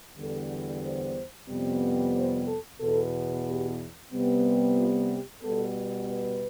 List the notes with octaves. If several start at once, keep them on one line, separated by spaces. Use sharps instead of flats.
E2 D3 G3 B3 A4
C5
F2 C3 G3 B3
C5
A4
E2 B2 B3 A4
G4
C3 G3 B3
F4
G4
B2 G3 B3 A4
B4